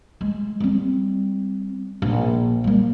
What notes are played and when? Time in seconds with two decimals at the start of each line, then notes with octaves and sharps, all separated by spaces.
0.21 G#3
0.60 G3 C4
2.02 A#1
2.64 G3 A#3